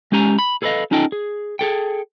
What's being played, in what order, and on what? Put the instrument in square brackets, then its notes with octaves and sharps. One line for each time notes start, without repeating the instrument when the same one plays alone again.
[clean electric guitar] G#3 C#4 G4 G#5 A#5
B5
G#4 A4 B4 C5 D#5 F5
C#4 D#4 F4 A4 D#5 G5
G#4
G#4 A4 G5